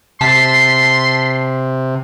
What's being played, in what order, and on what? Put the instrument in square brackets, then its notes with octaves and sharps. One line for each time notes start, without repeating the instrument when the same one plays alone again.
[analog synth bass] C3 [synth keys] A5 B6 C7 [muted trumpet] C6